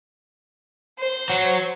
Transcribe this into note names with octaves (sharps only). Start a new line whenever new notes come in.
C5
F#3